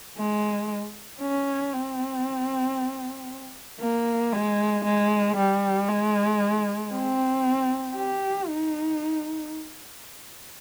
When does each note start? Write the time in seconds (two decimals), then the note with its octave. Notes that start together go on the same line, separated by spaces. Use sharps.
0.17 G#3
1.21 C#4
1.73 C4
3.80 A#3
4.32 G#3
4.84 G#3
5.36 G3
5.88 G#3
6.92 C4
7.96 G4
8.48 D#4